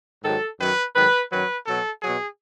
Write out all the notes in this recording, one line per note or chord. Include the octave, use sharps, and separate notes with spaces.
G#2 D#3 F#3 A4
F#2 D#3 F#3 B4
G#2 D#3 F#3 B4
F#2 D#3 F#3 B4
B2 F#3 A4
B2 F#3 G#4